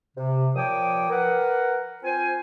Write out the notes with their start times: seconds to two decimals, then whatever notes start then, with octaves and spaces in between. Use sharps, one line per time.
0.17 C3
0.56 A#2 F3 C#5 G5 D6 D#6
1.10 A#4 B4 F#5
2.03 C4 F4 C5 G#5